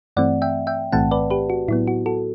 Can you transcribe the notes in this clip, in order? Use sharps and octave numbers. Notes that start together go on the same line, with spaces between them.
G2 E3 A3 C4 D5 F#5
E5 G5
E5 G5
B1 A2 E3 A3 C4 F#5 A5
B4 D5
G4 B4
F#4
A2 F#3 B3 E4
F#4
F#4 A4